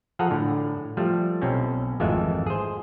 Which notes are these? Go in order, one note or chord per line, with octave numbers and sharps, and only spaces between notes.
F3 G#4 A4 F#5 A#5
A2 D3
F3 G3 A3
B1 C4 C#4
G#1 F2 E3 G#3 A3 E5
G#4 C5